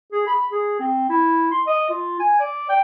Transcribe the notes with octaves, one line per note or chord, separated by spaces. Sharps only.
G#4
B5
G#4
C4
E4
C6
D#5
F4
G#5
D5
G5